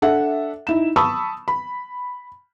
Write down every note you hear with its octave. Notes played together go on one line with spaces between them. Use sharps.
D4 A4 E5 F#5
D#4 E4 E7
A5 B5 C#6 D#6 E6
B5